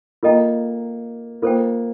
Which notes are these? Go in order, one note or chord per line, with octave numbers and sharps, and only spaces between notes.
A#3 F4 A4 D#5 G5 A#5
A#3 F4 A4 C5 G5